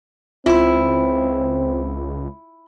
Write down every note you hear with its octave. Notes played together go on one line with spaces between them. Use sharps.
C#2 C4 E4 F4 C6